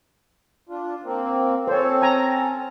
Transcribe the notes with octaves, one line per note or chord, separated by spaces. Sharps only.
D4 F4
A#3 C4
C4 C#4 A4 C5 C#5
G#5 A#5